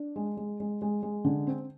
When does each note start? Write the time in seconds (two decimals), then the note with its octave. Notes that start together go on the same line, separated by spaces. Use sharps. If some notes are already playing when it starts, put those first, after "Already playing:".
Already playing: D4
0.16 G#3
0.37 G#3
0.60 G#3
0.82 G#3
1.03 G#3
1.25 D3
1.47 C4